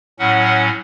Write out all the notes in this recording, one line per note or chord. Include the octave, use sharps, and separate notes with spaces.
A2 F#3 C#4 F#5